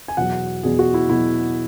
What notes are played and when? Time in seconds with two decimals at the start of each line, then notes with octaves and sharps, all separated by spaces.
0.08 G#5
0.17 E2 B2 F#3 F#5
0.63 E2 B2 F#3 G#4
0.79 F#4
0.94 E4
1.08 E2 B2 F#3 E4